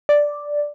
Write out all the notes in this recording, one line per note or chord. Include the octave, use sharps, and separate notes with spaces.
D5